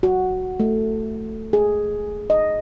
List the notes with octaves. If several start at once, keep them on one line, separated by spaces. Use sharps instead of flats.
F#4
A3
G#4
D#5